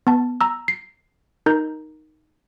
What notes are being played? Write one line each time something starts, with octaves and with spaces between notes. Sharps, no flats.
B3 A5
A#5 E6
C7
D#4 A#4 A#5 G6